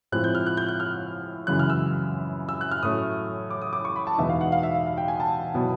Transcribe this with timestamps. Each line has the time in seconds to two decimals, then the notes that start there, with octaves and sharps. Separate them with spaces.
0.12 A2 F3 G#3 C4 E4 F#6
0.24 G6
0.35 F6
0.46 F#6
0.57 G6
0.68 F#6
0.80 F6
1.47 F#2 C#3 E3 G#3 F#6
1.59 F6
1.70 E6
2.49 E6
2.61 F#6
2.71 F6
2.83 A2 F#3 A3 C#4 D#6
3.51 D6
3.62 D#6
3.73 D6
3.85 C#6
3.96 B5
4.07 A5
4.18 E2 B2 G#3 B3 D#4 E5
4.29 F5
4.41 F#5
4.52 F5
4.63 E5
4.75 F5
4.86 F5
4.98 G5
5.08 G#5
5.20 A5
5.54 B2 F#3 B3 E4